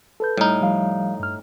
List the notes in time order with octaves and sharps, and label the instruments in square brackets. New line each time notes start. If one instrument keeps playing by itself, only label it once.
[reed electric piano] A4 B4 G6
[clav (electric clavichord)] A2 D#4 [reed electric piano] G3 E4 F6
[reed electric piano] F3 G3 F5
G2 F6